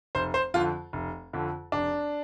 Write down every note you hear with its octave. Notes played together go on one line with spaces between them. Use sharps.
F1 C5
C5
F2 D3 F3 F4
F1
F2 D3 F3
F1 D4